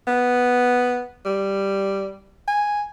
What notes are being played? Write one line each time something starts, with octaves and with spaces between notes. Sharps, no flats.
B3
G3
G#5